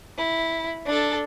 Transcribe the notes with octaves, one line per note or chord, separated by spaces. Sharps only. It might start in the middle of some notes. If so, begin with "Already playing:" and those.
E4
D4 A4